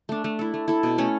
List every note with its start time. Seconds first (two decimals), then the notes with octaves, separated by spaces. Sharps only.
0.09 A3 D4
0.24 A3
0.39 E4 A4
0.54 A3
0.68 E4 A4
0.83 B2
0.98 A3 C#4